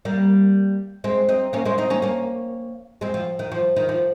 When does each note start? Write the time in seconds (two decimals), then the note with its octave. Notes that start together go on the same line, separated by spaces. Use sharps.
0.05 G3 A#3
1.04 G#3 C4
1.29 C4 D#4
1.53 A#3 C#4
1.65 G#3 C4
1.78 C4 D#4
1.90 A#3 C#4
2.02 A#3 C#4
3.01 G#3 C4
3.14 F3
3.39 D#3
3.52 F3
3.76 D#3
3.89 F3